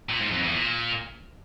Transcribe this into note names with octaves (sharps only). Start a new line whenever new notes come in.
A#2
G#2
F2
E2
A#2